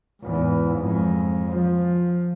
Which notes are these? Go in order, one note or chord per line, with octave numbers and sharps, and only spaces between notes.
E2 G#2
F2 G#3
F3